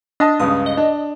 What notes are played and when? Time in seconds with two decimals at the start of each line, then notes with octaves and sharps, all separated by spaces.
0.20 D4 D#5 A5 D#6
0.40 C#2 G2 C#3 D#6
0.66 D#5
0.77 D4